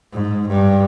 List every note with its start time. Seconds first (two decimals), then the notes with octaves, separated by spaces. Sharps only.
0.13 G#2
0.48 G2